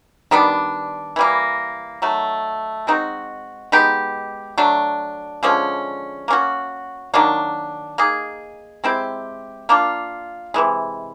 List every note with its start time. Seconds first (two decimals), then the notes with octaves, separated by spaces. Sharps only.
0.31 D#3 G3 B3 D4
1.16 E3 G3 A#3
2.02 D#3 F#3 A3
2.87 G#3 C4 D#4 F#4
3.72 G#3 B3 D#4 G4
4.58 F#3 A3 D4
5.43 D3 F3 G#3 C#4
6.28 A#3 C#4 F#4
7.14 D#3 F#3 A#3 D4
7.98 A#3 D#4 G#4
8.84 G#3 C4 E4 G4
9.69 A#3 D4 F4
10.54 C3 E3 G#3